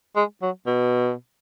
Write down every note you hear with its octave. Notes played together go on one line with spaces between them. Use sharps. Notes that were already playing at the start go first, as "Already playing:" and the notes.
G#3
F#3
B2